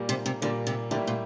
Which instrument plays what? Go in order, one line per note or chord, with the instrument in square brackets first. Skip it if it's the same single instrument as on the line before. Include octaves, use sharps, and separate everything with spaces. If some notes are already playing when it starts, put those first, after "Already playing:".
Already playing: [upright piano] A#2 G3 A#3
[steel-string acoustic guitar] C3
C3
[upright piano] A#2 G3 A#3 [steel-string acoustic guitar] D3
[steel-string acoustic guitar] C3
[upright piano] A2 G3 A#3 E4 G4 [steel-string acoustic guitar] D3
[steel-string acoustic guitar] A#2